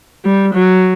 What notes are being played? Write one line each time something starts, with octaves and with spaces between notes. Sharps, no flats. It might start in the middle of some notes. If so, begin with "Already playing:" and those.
G3
F#3